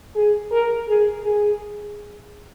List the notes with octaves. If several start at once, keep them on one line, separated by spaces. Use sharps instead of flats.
G#4
A#4
G#4
G#4